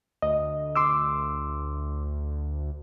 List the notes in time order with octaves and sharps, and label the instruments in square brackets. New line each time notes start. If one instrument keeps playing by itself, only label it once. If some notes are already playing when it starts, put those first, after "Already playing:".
[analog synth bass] D2 [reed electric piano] D#5
[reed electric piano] C6 D6 E6